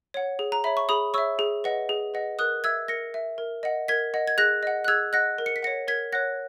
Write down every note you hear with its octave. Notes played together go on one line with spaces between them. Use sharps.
C#5 F#5
G#4
A#5
C#5 E5 B5
C#6
G#4 B5 D#6
C#5 E5 C#6 E6
G#4
B4 D#5 F#5
G#4
B4 D#5 F#5
A#4 D#6 F#6
E5 E6 G#6
A#4 A#6 C#7
E5
A#4
D#5 F#5
A#4 G#6 B6
D#5 F#5
G#6
G#4 F#6 A#6
D#5 F#5
F#6
G#4 E6 G#6
D#5 F#5 F#6 A#6
A#4
C#7
B6
C#5 F#5 A#6 C#7
A#4 G#6 B6
C#5 F#5 F#6 A#6